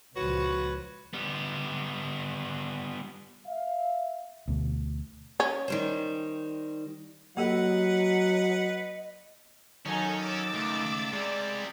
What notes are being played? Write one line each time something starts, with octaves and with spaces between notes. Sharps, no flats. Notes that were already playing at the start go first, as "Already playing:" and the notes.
C#2 A#2 F3 F#4 B4 C#5 C#6
G3 B3
E5 F5
D2 B2
C#4
D#3 G3 C5
F#3 A#3 G4 A4 B4 D#5 F#5
D#3 F#3 C#4 D#4 A4 G#5
D6 E6 A6
C#2 A3
C3 G3 G#3 D5